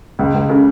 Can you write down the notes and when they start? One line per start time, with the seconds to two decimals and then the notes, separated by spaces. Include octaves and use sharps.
0.19 C#2
0.34 C#2
0.49 C#3